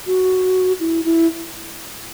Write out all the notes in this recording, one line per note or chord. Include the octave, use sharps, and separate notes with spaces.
F#4
E4
E4